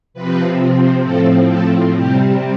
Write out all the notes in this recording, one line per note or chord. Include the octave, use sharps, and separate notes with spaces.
C3 F3 C4 B4
A2 F3 C4 A4
A4
C3 G3 C4 G4